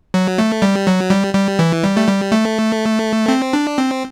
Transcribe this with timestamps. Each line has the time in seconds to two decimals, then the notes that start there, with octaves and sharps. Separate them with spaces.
0.14 F#3
0.38 A3
0.62 G3
0.87 F#3
1.10 G3
1.34 G3
1.59 E3
1.83 G3
1.97 A3
2.08 G3
2.32 A3
3.28 C4
3.53 D4
3.78 C4